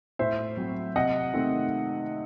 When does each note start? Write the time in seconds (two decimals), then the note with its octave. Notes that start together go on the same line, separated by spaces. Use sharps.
0.19 A2 C5 E5
0.57 F#3 C4
0.95 C3 D#5 F#5
1.34 D#3 A3 C4